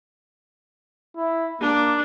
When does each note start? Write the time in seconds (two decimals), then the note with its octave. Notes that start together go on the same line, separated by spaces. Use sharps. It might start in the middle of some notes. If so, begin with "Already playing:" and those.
1.17 E4
1.61 A#3 D4